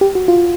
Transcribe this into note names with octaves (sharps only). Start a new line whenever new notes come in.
G4
F#4
F4